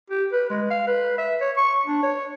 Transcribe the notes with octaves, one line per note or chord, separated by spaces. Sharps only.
G4
B4
G#3
F5
B4
E5
C#5
C#6
D4
C#5